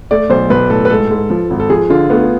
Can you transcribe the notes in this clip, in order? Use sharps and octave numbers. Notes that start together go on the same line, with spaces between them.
A3 D5
B1 C5
B1 B4
A2 A4
B4
G#2 A4
G#2
F3
G#1
A4
F3 G#4
D3 F4
A3 B3